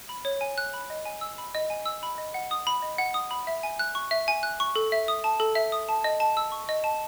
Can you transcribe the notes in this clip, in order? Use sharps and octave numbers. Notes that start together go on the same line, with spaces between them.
B5
C#5
G#5
F#6
B5
D#5
G#5
E6
B5
D#5
G#5
E6
B5
D#5
F#5
D#6
B5
D#5
F#5
D#6
B5
E5
G#5
F#6
C#6
E5
G#5
F#6
C#6
A4
E5
D#6
A5
A4
E5
D#6
A5
D#5
A5
E6
C#6
D#5
A5